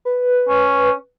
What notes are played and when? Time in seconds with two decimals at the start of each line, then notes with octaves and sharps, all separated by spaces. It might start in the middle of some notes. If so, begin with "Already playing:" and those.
0.05 B4
0.49 C#4